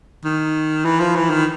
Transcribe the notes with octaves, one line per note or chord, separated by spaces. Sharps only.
D#3
E3
F3
E3
D#3